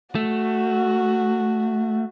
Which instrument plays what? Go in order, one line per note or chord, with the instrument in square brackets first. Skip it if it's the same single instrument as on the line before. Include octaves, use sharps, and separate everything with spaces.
[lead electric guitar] A3 [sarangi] F#4